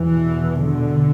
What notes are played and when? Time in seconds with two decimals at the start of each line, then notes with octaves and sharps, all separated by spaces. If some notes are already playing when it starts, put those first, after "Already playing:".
Already playing: E2 B2 E3
0.63 D3